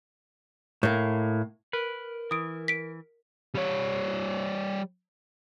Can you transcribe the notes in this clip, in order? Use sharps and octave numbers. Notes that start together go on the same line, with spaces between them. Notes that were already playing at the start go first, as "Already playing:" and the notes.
A2 A#3
A#4 B4
E3 D#6 D7
B6 D7
G3 C#5